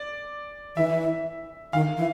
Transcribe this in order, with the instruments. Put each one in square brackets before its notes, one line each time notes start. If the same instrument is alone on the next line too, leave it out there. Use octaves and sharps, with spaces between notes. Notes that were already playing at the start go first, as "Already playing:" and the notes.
Already playing: [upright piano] D5
[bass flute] E3 [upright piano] E5
[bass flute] D#3 [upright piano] F5
[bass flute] E3